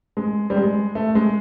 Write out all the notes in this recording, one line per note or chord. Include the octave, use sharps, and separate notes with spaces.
G#3
G3
G#3
A3
G#3